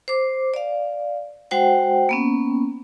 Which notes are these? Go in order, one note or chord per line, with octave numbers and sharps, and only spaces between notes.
C5 D6
D5 F5
G#3 F#4 C5 F#5 G5
A#3 B3 C#4